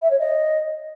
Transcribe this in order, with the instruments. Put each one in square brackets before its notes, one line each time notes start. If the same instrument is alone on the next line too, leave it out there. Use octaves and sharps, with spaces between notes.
[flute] E5
C#5
D#5